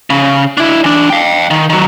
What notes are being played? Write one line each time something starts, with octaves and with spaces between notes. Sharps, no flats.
C#3
D4 E4
E3 D4
F5 G5
D#3
D#3 F#3